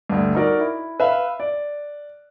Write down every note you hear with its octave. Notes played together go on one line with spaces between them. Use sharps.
D2 G2
D#4 F#4 A#4 D5
E4
B4 E5 F5
D5